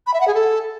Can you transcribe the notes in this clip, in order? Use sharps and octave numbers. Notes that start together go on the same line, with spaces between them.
B5
E5
F#5
G#4
A4